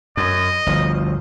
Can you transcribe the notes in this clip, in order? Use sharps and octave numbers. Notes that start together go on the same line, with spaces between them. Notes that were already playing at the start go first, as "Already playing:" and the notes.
F#2 D#5
G1 D2 F3